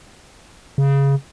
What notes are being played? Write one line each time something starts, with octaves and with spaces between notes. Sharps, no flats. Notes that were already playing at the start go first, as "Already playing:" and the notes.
C#3